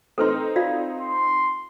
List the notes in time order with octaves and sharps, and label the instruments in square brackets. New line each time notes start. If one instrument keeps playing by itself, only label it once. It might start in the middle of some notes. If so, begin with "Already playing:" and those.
[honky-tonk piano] C4 D#4 [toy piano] A4 B4 C6
[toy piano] F4 D5 F5
[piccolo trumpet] C6